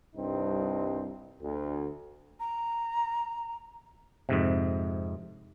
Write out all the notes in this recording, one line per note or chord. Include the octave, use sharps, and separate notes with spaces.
C2 G2 C4 D#4
D2
A#5
F2 G#2 C3